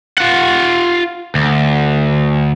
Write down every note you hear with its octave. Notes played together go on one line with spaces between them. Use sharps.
F4 F#5
D2